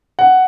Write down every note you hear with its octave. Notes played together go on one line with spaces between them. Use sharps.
F#5